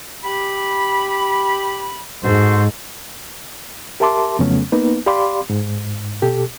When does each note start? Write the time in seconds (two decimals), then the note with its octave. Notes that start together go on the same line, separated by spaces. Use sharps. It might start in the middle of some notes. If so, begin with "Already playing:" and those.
0.24 G4 B5
2.23 G#2 F#4 A4 C5
4.00 G4 A#4 E5 A5 C6 D6
4.39 F2 C#3 F#3 A3 B3 C#4
4.72 A#3 B3 D#4 B4
5.07 G4 D5 F5 B5 C6 D6
5.50 G#2
6.22 B2 G4 A4